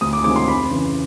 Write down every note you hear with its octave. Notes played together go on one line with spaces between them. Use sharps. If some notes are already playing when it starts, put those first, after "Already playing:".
D2 D#6
D6
C3 D#3 G#3 C4 D6
C6
F2 B5
C#3 E3